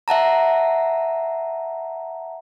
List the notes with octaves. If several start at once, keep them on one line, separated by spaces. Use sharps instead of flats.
E5 F#5 A5 A#5